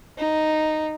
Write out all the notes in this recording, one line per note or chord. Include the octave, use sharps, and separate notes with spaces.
D#4